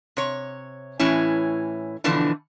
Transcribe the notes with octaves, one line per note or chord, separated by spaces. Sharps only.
C3 C#5
A2 E3 C#4 E4
B2 D3 E3 F3 D4